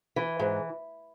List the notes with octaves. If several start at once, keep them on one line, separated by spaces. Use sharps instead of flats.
E3
G#2